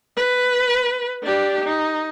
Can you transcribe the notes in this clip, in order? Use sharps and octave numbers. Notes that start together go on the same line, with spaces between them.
B4
D4 G4
D#4